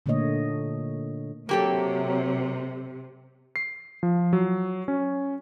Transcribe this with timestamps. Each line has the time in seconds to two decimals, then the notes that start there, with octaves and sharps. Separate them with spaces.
0.06 A#2 D3 A3 A#3 C#5 D#5
1.49 C3 F#3 A#3 G4 A4
3.56 C7
4.03 F3
4.33 F#3
4.88 C#4